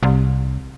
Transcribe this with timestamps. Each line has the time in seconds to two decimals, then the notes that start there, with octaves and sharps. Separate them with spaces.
0.03 C2